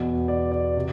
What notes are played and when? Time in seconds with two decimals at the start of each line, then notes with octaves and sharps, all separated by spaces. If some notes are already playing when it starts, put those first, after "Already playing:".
Already playing: E2 B2
0.28 D5
0.52 D5
0.77 C3